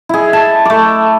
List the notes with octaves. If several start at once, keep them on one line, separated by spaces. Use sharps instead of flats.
E4 G#4
A5
A3 D6